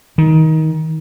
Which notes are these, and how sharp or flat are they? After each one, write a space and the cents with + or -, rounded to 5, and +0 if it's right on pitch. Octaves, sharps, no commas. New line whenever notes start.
D#3 +20